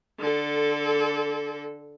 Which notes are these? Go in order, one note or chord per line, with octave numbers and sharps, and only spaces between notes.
D3 A4